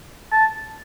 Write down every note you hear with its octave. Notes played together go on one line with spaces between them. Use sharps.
A5